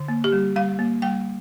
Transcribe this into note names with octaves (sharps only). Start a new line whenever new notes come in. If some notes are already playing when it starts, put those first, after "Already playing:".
Already playing: D3
A#3
G4
G3
G3 F5
A#3
G3 G5